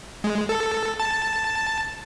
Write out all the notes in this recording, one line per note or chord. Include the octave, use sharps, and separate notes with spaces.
G#3
A4
A5